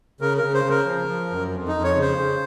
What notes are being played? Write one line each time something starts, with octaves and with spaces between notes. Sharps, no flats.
C#3 A#4
A#4
C#3
C5
C#3
A#4
F3
F3
F#2
F2
D#4
F2
C#5
C#3
C5
C#3